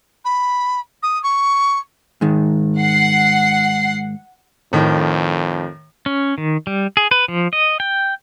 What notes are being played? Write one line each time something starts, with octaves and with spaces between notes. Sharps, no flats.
B5
D#6
C#6
G#2 D#3
F#5 C7
F2 A2 D#3
C#4
D#3
G3
G#4
B4
F3
D#5
G5